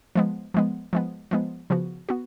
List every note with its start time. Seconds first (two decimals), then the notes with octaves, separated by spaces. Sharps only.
0.15 F3 G#3 B3
0.54 F3 G#3 B3
0.93 F3 G#3 B3
1.31 F3 G#3 B3
1.70 C#3 F3 B3 F#4
2.09 B3 F#4